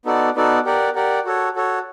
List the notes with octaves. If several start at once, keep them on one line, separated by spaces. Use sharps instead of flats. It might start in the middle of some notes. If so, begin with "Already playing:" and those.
B3 D#4 F#4 A4 D5
B3 D#4 F#4 A4 D5
G4 A#4 D5 F#5
G4 A#4 D5 F#5
F#4 A4 C#5
F#4 A4 C#5